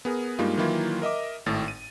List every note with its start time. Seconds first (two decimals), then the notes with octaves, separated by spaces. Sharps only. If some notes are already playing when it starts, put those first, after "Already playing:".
0.05 B3 G#4 A#4
0.39 G2 G3 G#3 A#3 D#4 F4
0.58 D#3 E3 F#3 A#3 E4 F4
1.02 A#4 D#5 E5 D6
1.46 G#1 A2 A3 A6
1.68 D#7